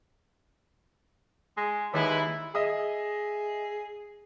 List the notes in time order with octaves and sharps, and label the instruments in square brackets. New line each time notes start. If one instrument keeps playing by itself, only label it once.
[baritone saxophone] G#3
[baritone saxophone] D#2 [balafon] D#3 [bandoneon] G#3 B4 E5 [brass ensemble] E4
[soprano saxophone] G#4 [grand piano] D#5 E5 D#6